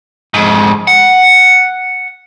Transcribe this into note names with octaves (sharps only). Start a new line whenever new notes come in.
F2 G#2
F#5